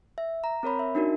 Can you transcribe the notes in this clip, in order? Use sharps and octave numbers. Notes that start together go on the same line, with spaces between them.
E5
A#5
C4 A#4 C#5 B5
E5
D4 D#4 F#4 A#4